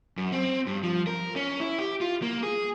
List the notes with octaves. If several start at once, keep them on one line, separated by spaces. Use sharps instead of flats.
F#2
C4
G2
F3
A#4
C#4
E4
G4
F4
A#3
G#4